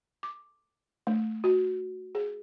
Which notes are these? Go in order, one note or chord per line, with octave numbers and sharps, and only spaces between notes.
D6
A3
F#4
G#4